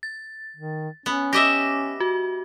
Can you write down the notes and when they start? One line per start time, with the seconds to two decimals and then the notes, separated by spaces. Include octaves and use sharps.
0.03 A6
0.56 D#3
1.06 B3 C#4
1.33 G4 D#5 E5 D6 A#6
2.00 F#4